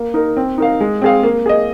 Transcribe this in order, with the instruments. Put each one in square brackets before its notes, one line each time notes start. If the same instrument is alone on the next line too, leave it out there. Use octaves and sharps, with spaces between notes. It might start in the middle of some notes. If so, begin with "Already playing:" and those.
Already playing: [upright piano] A#3
D#4 A#4
C4
D#4 A#4 F5
G#3
C4 G#4 F5
A#3
G#4 D#5